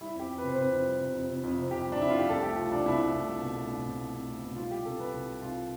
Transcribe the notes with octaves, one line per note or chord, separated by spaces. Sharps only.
G3 E4
F2 G4
F2
B4
C3
C5
C3 B4
F2
G3
C3
F2
C3
F2
C3
F2 G4
G3
D4
F2 E4
F4
F2 G4
C2 A4
A3 G4
C2 F4
C2 D4
C2 E4
A3
C2
C2
B2
A3
C2
B2
A3
C2
A3
B2
G3 F4
G3 G4
C2 A4
C2 B4
C2
G3
C2 F4
G3